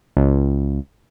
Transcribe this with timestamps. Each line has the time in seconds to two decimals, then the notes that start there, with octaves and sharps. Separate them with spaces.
0.17 C#2